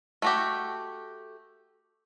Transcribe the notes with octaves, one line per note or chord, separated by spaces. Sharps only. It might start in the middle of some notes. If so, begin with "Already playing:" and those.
A3 F#4 G4